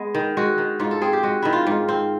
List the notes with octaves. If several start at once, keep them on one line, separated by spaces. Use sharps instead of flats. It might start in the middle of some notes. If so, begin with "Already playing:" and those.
Already playing: G#3 B3
D#3
G#3 F#4
D#3
G#2 F4
A4
C4 G#4
G4
G#3 F#4
D#3 E4
F4
G#2
C4